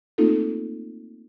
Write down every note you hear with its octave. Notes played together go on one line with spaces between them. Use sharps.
A3 A#3 C4 D#4 F4 A4